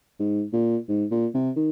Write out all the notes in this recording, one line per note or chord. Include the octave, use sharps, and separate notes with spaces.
G#2
A#2
G#2
A#2
C3
D#3